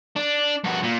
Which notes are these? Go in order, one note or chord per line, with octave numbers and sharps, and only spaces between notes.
D4
G2 F#4
A#2